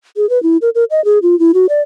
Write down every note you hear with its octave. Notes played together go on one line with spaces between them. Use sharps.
G#4
B4
E4
A#4
A#4
D#5
G#4
F4
E4
F#4
D5